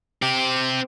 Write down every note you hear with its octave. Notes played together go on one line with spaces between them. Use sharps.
C4 G4